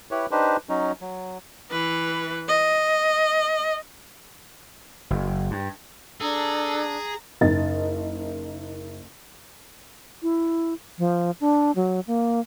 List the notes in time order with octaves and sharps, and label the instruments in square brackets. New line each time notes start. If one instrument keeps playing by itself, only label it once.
[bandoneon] E4 G4 B4 C#5
D4 D#4 G4 B4 C5
F#3 C#4 D#4
F#3
[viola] E3 B4
D#5
[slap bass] F#1
G2
[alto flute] D4 [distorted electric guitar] G#4 [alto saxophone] A4 [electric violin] A#5
[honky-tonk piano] F#1 D#4 D#5 A6
[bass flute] E4
F3
D4
F#3
A#3